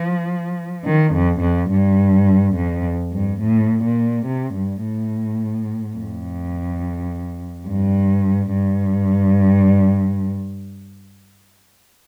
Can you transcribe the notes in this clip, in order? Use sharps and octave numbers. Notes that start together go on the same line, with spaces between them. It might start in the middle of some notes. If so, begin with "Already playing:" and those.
Already playing: F3
D#3
F2
F2
G2
F2
G2
A2
A#2
C3
G2
A2
F2
G2
G2